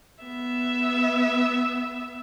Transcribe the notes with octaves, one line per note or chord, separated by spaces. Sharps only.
B3 E5